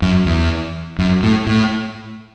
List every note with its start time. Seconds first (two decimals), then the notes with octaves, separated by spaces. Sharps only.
0.02 F#2
0.26 E2
0.99 F#2
1.23 A2
1.47 A2